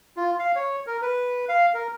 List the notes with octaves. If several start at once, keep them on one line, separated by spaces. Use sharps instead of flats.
F4
F5
C#5
A#4
B4
F5
A#4